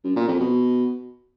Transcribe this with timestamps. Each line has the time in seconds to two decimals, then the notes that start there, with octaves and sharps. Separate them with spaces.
0.04 F#2
0.16 A#2
0.28 F2
0.40 B2